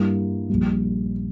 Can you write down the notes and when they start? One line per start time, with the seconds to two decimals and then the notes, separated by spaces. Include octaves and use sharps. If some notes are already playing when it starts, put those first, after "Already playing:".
Already playing: G2 G3 A#3 E4
0.50 A#1 A#2 G3